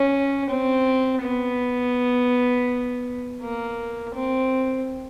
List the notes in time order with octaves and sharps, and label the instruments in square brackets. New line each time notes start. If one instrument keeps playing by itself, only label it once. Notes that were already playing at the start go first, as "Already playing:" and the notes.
Already playing: [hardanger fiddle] C#4
C4
B3
A#3
C4